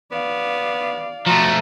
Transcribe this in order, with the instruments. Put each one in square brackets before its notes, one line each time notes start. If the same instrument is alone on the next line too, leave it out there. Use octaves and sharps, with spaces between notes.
[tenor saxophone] B3 [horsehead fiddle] D5 F5
[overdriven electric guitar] F3 A3 [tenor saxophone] F#4 [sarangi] A#5